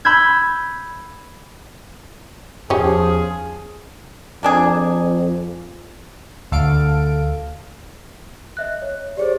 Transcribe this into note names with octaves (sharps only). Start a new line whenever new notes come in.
B5 E6 G6 G#6
E2 F3 C#4 G4 G#4
F2 A#3 D4 G#4
D2 A4 F5 D7
D#5 E5 F#6
C#5
G4 G#4 C5 D5